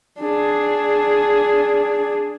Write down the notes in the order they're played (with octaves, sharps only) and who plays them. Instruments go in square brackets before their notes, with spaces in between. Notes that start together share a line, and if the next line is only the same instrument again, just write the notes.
[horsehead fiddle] D4 G#4